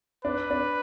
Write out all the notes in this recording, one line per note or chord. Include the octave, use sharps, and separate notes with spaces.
D4 B4
D4